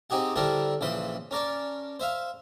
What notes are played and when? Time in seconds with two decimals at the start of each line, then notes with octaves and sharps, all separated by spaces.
0.10 C4 D#4 G4 G#4 F#5
0.36 D3 G3 D4 E4 A#4 C5
0.81 A#1 C#3 E3 C5 B5 C6
1.31 C#4 A#4 D5 A5
2.00 C5 E5 F5